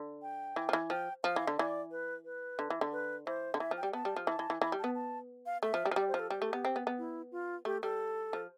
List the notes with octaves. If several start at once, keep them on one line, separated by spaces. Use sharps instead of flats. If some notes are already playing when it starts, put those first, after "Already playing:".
Already playing: D3
G5
E3
F3
E3
F3 G5
F3 F5
E3
D3
E3 D5
B4
B4
D3
E3
D3
B4
E3 C5
D3
E3 E5
F3
G5
G3
B3 A5
G3
F3
E3 A5
E3
E3
E3 B5
G3
A5
B3
A5
F5
A3 E5
F3
G3
F3
G3 D5
C5
F3
A4
G3 G4
A3
B3
C4
B3
B3
E4
F4
A3 G4
G3 A4
F3